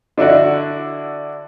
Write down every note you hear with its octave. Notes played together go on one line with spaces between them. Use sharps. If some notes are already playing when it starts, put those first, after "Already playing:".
D3 D4 E4 F#4 D5